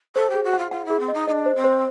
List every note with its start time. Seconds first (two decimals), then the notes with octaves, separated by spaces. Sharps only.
0.15 A4 C5
0.30 G4 G#4
0.44 F#4
0.53 F4 F#5
0.71 F4 F#5
0.85 E4
0.90 G#4
0.99 C4
1.08 D#5
1.14 D#4
1.27 D#4 D#5
1.31 D4
1.46 C5
1.56 C4
1.64 C5